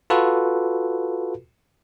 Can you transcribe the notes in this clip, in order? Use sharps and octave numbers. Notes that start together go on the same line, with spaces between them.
F4 F#4 A4 B4